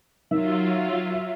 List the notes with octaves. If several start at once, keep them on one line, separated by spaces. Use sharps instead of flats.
D#3 F#3 F4 E5